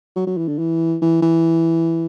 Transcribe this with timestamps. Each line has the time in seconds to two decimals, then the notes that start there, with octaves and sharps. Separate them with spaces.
0.16 F#3
0.27 F#3
0.37 E3
0.48 D3
0.58 E3
1.02 E3
1.22 E3